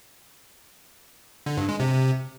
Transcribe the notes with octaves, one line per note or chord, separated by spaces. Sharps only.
D3
G2
G#3
C3